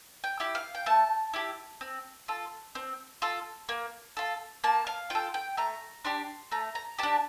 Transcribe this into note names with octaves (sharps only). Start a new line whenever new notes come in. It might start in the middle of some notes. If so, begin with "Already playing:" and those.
G5
E4 G4
F5
G5
A3 A5
E4 G4
C4
F4 A4
C4
F4 A4
A#3
F4 A4
A#3 A5
F5
F4 A4 G5
G5
A3 A#5
D4 G4 C6
A3 A#5
A#5
D4 G4 A5